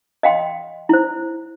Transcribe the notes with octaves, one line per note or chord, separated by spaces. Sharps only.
D#5 F5 G5 C6
E4 C5